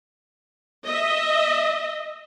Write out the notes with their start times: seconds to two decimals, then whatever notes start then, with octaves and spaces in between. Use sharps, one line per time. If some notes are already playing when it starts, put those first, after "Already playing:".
0.84 D#5 E5